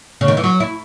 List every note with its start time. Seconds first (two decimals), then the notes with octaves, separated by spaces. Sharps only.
0.21 C#3
0.28 D#3
0.37 E3
0.44 F#3
0.60 E4